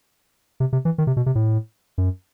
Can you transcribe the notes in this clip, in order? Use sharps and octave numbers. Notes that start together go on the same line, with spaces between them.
C3
C3
E3
D#3
C3
B2
C3
A2
F#2